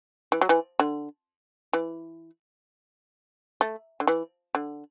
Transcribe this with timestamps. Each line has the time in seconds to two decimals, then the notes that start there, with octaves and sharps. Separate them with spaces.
0.32 E3
0.41 F#3
0.49 E3
0.79 D3
1.73 E3
3.61 A3
4.00 D3
4.07 E3
4.55 D3